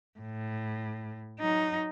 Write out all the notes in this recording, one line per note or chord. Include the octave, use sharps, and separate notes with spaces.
A2
F#3 D#4